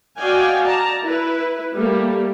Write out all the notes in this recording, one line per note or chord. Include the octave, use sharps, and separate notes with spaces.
F#4 D5 D#5 F5 G5 G#5
D5 A5 A#5
E4 B4
G3 A3 A#3